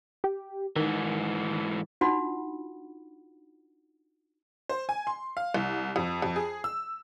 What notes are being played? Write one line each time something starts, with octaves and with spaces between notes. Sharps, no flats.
G4
G#2 D#3 E3
D4 D#4 F4 F#4 F#5 B5
C5
G#5
C6
F5
C2
F2
F2
G#4
E6